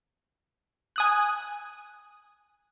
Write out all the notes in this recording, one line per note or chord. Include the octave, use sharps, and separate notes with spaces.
G#5 D#6 F#6